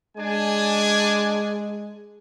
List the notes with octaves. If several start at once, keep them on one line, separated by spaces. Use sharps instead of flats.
G#3 D4 G#5